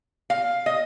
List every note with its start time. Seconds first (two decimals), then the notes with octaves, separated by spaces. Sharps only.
0.30 F5
0.66 D#5